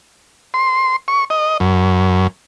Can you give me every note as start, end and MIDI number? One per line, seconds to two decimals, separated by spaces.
0.54 0.96 84
1.08 1.25 85
1.30 1.57 75
1.60 2.27 42